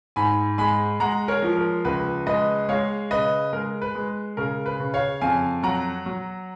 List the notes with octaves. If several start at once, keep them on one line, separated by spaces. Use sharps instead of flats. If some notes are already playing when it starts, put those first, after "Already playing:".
G#2 G#5 B5
G#3 G#5 B5
G#3 F#5 A#5
A#4 C#5
F3
A#4
C#2 B4
G#3 B4 D#5
G#3 C#5 F5
C#3 B4 D#5
G#3 A#4
B4
G#3
C#3 A#4
B4
C#3
C#5 F5
F2 F5 G#5
F#3 F#5 A#5
F#3